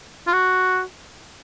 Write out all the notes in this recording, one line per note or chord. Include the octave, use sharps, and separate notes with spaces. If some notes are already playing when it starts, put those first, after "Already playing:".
F4
F#4